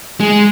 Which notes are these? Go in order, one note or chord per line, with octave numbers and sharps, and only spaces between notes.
G#3